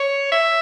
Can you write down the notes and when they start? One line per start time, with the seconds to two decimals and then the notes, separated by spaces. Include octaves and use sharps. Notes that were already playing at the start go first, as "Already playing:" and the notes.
Already playing: C#5
0.32 E5